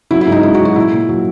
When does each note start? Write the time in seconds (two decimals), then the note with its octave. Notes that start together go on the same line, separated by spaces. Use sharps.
0.11 F#3 E4
0.21 E4
0.27 G#2 D#4
0.43 G#2 E4
0.54 F#4
0.60 F#3
0.65 F#4
0.76 A#2 E4
0.93 A#2
1.09 F#3